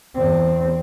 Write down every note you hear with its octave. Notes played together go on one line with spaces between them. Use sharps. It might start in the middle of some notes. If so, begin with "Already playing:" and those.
E2 C4